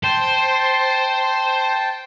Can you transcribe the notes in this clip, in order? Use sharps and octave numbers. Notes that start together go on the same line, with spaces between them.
C5 G5 A5